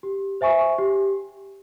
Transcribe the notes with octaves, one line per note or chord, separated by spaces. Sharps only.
G4
C5 E5 G#5 C#6
G4